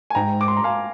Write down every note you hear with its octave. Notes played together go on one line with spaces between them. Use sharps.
G#5
G#2 G5 A#5
D6
C6
A#5
F5 G#5